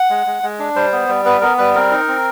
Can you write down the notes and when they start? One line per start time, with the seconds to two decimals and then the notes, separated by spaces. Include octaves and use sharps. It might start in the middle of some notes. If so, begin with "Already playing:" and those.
Already playing: F#5
0.10 G#3
0.27 G#3
0.43 G#3
0.59 D4
0.75 G3 C5
0.92 B3
1.08 G3
1.25 B3 B4
1.41 B3 A#4
1.58 G3 B4
1.75 C4 A#4
1.91 D#4
2.08 C4